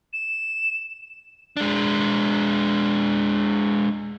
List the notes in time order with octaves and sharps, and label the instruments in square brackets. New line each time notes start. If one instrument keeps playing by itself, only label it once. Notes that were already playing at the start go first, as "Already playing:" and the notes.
[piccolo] E7
[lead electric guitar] G#3 D4